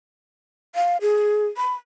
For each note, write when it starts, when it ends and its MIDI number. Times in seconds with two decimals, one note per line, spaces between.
0.75 0.97 77
1.01 1.47 68
1.57 1.73 83